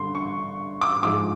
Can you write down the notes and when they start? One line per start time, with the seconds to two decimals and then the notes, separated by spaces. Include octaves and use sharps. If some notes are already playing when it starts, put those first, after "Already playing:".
Already playing: G2 D3 C6
0.15 C#6
0.81 D6
1.03 G#2 F3 G#3 D6